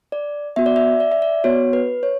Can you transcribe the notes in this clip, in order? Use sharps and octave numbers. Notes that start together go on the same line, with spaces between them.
D5
B3 F#4 E5
D5
E5
D5
E5
D5
B3 F#4 C#5
B4
C#5